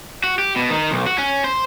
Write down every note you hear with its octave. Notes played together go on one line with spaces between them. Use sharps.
F#4
G4
B2
D#3
B1
F#4
C#4
C5